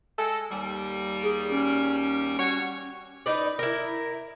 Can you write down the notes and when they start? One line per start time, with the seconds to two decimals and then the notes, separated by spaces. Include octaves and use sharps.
0.18 G#3 A4
0.51 D#2 G3
1.23 G#4
1.51 C#4
2.39 F#4 C#5
3.26 D#4 B4 D5
3.59 E4 A#4